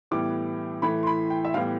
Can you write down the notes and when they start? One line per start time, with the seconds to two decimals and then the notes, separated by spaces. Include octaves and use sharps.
0.11 A2 E3 G3 B3 D6
0.82 A2 E3 A3 B5
1.03 C6
1.07 B5
1.30 G5
1.45 E5
1.54 A2 E3 G3 B3 F5